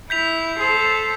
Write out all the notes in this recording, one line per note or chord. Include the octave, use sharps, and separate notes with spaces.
E4 G6 B6 F7
A4 C5